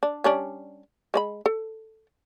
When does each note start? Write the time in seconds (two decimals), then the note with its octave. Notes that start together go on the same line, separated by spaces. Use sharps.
0.03 D4
0.24 G3 C#4 D4
1.14 G#3 D5 B5
1.46 A4